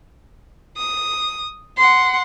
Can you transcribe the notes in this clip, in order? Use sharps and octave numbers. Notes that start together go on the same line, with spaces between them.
D#6
F#5 C6